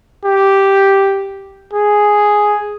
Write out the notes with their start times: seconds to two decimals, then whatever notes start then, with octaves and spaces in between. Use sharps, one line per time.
0.25 G4
1.73 G#4